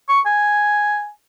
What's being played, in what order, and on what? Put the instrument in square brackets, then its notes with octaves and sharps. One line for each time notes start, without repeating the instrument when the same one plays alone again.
[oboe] C#6
G#5